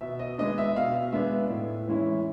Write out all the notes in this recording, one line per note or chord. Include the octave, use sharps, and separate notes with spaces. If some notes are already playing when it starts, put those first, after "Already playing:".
B2 E5
D#5
G#3 B3 D4 D#5
E5
B2 F5
G#3 B3 D4 E5
A2
E3 G#3 C#4 E4